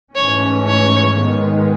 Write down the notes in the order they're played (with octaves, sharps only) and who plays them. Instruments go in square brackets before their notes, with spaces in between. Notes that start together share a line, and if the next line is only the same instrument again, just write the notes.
[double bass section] G#2 E3 A3 C#4 [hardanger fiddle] C#5
[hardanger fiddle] C#5
[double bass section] G#2 D#3 G#3 B3